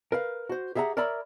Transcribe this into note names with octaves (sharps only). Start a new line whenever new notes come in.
A#4 B4 F5
F#4 C5
G4 G#4 E5 F#5 A#5
A#4 C#5 D5 E5 A#5 B5